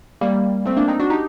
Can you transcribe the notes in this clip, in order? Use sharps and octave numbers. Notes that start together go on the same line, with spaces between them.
G3 A#3
A3 C4
A#3 D4
C4 D#4
D4 F#4
D#4 G4